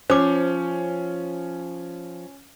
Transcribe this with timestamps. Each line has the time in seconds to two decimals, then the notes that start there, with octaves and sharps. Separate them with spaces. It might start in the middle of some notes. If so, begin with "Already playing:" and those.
0.10 F3 C#4 C5 D6